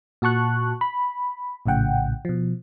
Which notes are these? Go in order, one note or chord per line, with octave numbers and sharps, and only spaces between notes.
A#2 F#4 A5 C#6 F#6
B5
A#1 A2 C#3 F#5 G5
B2 F3